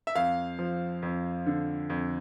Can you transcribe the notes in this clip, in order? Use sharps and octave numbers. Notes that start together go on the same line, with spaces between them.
E5
F2 F5
F3
F2
D3
F2